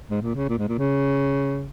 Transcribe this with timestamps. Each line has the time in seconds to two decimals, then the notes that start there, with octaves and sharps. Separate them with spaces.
0.10 G#2
0.22 A#2
0.35 C#3
0.49 A#2
0.59 G#2
0.69 A#2
0.78 C#3